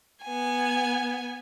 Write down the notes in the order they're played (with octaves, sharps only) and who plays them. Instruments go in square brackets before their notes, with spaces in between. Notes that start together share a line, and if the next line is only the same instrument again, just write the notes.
[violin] B3 G#5